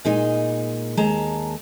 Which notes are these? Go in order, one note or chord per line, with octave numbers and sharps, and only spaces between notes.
A#2 G#3 D#4
D#2 G#3 A5 A#5